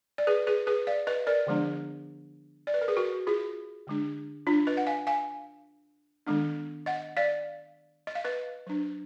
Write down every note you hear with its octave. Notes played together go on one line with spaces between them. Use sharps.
D5
G#4 B4
G#4 B4
G#4 B4
D5 F5
B4 D#5
A#4 D5
D3 F3 G#3 B3 D4
D5
B4
A#4
G#4 B4
F#4 A#4
F4 G#4
D3 G#3 D4
D4 F4
B4 D#5
F#5
F5 G#5
F5 G#5
D#3 G#3 B3 D4
D#5 F#5
D5 F5
D#5
F5
B4 D#5
F#3 D4